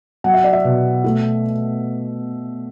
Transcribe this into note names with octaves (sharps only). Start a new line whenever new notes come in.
F#3 F#5
E5
D5
E5
B2
A3